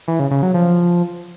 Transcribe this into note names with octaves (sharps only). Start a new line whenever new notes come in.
E3
C#3
C#3
F#3
F3